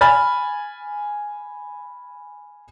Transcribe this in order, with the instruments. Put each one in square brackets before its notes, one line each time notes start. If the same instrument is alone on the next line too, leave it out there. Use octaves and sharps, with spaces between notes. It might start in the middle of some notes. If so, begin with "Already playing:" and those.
[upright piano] G#5 B5 F6 A6